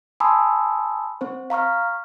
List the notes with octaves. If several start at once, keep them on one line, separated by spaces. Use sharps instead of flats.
G#5 A5 B5 C6 D#6 E6
C4 C5
F5 A#5 C#6 F6